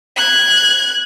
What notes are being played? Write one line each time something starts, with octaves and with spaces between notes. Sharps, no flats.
F#6 G#6